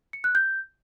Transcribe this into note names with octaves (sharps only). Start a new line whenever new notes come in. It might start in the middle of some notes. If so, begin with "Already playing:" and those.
C#7
F#6
G6